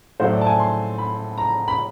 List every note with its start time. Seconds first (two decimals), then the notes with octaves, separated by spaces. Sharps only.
0.20 A2 F#3 A3 C5
0.33 D5
0.41 A5
0.47 G#5
0.59 C6
0.98 B5
1.38 A#5
1.68 B5